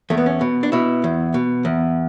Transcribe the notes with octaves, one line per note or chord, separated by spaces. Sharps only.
E2 A3
B3
C#4
B2
D4
B2 E4
E2
B2
E2